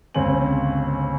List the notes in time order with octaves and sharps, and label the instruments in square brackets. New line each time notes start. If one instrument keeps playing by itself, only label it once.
[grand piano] G1 C#2 C4 C#5 G#5 F#7